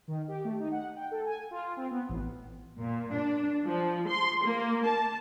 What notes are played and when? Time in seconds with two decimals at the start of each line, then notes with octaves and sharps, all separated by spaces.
0.08 D#3
0.28 G4
0.45 A3
0.59 D#4
0.72 F#5
0.96 G5
1.11 A4
1.25 G#5
1.51 F4
1.77 C4
1.91 B3
2.09 A1
2.81 A#2
3.15 D4
3.63 F3
4.07 C6
4.43 A#3
4.85 A5